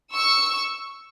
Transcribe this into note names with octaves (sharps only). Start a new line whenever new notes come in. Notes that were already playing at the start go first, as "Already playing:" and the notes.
C#6 E6